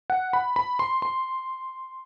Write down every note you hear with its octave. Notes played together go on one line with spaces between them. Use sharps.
F#5
B5
B5
C6
C6